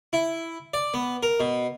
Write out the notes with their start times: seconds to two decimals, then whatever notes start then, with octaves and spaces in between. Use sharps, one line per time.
0.13 E4
0.74 D5
0.94 B3
1.23 A#4
1.40 B2